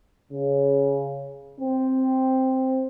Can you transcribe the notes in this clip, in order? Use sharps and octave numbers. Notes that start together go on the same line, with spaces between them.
C#3
C4